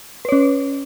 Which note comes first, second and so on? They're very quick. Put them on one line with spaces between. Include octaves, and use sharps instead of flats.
B4 C#5 C#4